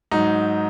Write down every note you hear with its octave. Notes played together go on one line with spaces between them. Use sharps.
G#2 F#3 D#4